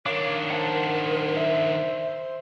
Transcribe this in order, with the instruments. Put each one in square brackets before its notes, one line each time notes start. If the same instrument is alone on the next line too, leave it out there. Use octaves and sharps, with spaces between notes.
[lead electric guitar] D#3 D4 [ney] A#4 [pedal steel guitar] C#5 F5 D6
[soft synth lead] C5 [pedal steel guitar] F#5 A5
[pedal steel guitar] E5